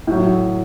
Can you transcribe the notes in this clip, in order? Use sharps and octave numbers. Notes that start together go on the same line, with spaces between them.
A2 F#3